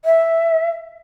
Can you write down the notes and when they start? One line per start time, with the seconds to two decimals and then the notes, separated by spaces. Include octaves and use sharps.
0.05 E5